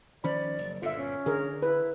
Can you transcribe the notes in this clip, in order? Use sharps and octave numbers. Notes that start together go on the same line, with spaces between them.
D#3 F3 C#4 C5 D5 B5
F#1
G1 A#2 D3 F4 A4 E5
C#4
D3 D4 G#4 A#4
E4 B4